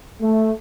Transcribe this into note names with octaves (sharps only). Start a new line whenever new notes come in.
A3